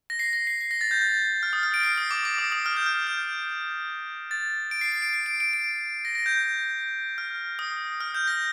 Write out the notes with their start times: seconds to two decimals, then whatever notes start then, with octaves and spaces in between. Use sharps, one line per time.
0.10 A#6
0.19 C7
0.33 A#6
0.47 C7
0.61 C7
0.71 A#6
0.81 A6
0.91 G6
1.01 A6
1.43 F6
1.53 D#6
1.63 F6
1.74 D7
1.83 C7
1.98 D#6
2.11 D6
2.25 D6
2.38 D#6
2.52 D#6
2.66 F6
2.76 G6
2.86 F6
3.07 G6
4.31 A6
4.71 D7
4.81 C7
4.92 C7
5.02 D7
5.13 C7
5.26 D7
5.40 D7
5.53 D7
6.05 A#6
6.15 A#6
6.26 G6
7.18 F6
7.59 D#6
8.00 F6
8.14 G6
8.27 A#6